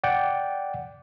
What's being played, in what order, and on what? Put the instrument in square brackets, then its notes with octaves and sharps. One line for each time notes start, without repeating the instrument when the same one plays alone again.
[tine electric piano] D5 F#5 G5